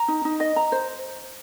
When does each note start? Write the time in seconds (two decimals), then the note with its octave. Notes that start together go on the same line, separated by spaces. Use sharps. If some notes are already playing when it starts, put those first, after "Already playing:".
Already playing: A#5
0.08 D#4
0.25 D#4
0.40 D#5
0.56 A#5
0.72 C5